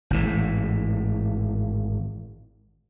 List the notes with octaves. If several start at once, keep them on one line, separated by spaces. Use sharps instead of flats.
G#1 A2 E3